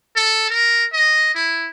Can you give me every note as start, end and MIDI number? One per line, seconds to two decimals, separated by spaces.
0.16 0.46 69
0.50 0.85 70
0.93 1.30 75
1.35 1.68 64